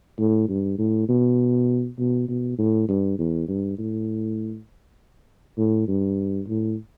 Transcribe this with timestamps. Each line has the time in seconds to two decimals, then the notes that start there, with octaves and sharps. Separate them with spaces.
0.19 A2
0.48 G2
0.79 A2
1.09 B2
1.99 B2
2.28 B2
2.59 A2
2.89 G2
3.19 E2
3.48 G2
3.78 A2
5.58 A2
5.88 G2
6.48 A2